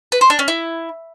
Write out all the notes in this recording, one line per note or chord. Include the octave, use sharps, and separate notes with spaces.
B4
C5
D4
C#4
E4